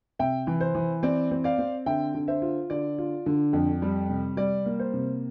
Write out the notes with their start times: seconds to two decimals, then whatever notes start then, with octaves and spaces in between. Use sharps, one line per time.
0.19 C3 E5 G5
0.47 E3
0.60 C5
0.75 E3
1.03 C4 D5
1.31 C4
1.44 D5 F5
1.58 C4
1.86 D3 E5 G5
2.15 D3
2.28 C5 E5
2.42 F4
2.70 D3 D5
2.98 F4
3.26 D3
3.53 F2
3.82 G3
4.09 C3
4.37 G3 D5
4.66 A#3
4.79 C5
4.94 C3